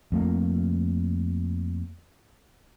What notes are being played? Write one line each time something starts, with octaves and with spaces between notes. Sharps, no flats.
F2 A3 A#3